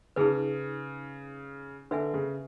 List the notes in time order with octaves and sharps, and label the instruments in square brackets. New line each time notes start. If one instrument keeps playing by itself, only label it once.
[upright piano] C#3 [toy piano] D#4 G#4 B4
[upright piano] D3 [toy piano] B4 E5 G#5
[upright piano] C#3